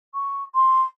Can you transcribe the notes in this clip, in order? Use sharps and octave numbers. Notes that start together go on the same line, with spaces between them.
C#6
C6